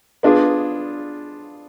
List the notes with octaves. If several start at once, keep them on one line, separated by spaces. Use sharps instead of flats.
B3 D4 F4 G#4